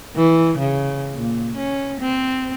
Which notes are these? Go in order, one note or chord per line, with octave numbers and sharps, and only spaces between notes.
E3
C#3
A#2
C#4
C4